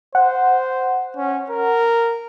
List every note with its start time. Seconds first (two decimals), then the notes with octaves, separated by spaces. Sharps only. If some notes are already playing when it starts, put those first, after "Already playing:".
0.15 C5 F#5
1.17 C#4
1.50 A#4